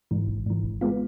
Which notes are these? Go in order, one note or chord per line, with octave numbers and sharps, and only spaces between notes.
G#2 E3
G#1
G#2 E3
G#1
G#3 B3 F4